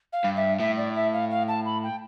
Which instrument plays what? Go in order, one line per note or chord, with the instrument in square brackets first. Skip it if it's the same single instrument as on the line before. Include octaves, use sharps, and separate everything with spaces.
[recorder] F5
[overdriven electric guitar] G2
[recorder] E5
[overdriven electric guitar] A2 [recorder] E5
[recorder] D5
E5
F5
F5
A5
B5
G5